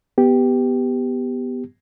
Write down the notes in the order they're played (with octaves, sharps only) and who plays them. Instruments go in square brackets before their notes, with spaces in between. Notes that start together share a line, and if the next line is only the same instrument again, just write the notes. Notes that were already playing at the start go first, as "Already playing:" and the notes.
[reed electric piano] B3 G4